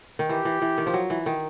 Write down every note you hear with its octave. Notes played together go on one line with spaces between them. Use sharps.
D#3
E3 G4
E3
E3
D#3
F3
F#3
E3
D#3